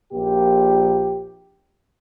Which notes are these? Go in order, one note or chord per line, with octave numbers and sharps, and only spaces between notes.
A#1 A#2 G4